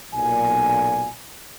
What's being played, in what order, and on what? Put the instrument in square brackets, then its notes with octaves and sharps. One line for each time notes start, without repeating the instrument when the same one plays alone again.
[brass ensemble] B1 A#2 G#5